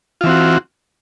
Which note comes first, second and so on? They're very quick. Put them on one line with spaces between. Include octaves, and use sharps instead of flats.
F4 E3 C4 F#4